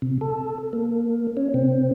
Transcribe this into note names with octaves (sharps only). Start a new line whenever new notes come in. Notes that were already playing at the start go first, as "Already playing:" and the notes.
C3
A4
A#3
C#4
C3 C4